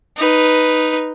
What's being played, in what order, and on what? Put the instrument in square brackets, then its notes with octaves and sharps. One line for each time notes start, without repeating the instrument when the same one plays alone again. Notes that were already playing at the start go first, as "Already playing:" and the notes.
[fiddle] D#4 B4